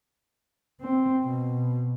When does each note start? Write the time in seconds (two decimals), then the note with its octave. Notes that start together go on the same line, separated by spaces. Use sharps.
0.81 C4
1.26 B2